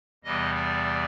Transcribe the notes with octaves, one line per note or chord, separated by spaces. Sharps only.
E2 C3 E3 G3 B3 D#5
D5